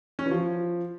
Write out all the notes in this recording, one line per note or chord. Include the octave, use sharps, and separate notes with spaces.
C#4
E3
F3